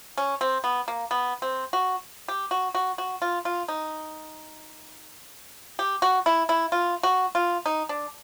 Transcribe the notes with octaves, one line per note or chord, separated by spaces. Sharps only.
C#4
C4
B3
A#3
B3
C4
F#4
G4
F#4
F#4
F#4
F4
F4
D#4
G4
F#4
E4
E4
F4
F#4
F4
D#4
D4